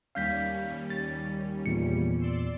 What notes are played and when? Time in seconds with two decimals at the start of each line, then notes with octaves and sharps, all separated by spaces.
0.15 D#2 G3 C#4 F5 G6 B6
0.90 A6
1.66 E2 A#2 C#7
2.20 D5 C6 E6